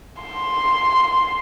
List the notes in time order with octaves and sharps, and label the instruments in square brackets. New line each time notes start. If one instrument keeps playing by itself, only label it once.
[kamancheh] C6